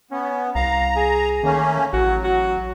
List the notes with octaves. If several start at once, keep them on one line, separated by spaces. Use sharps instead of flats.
B3 C#4
C2 F5 A#5
G#4
D#3 A3 A#3 C#4
A1 F#3 F#4
F#4